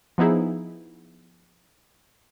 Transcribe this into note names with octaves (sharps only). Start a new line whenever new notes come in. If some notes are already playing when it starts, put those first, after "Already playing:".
F3 B3 D#4 E4 G#4